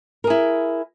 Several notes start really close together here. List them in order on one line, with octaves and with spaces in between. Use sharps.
A#4 G#4 E4